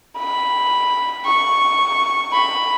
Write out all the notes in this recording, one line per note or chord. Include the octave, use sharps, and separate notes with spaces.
B5
C#6
B5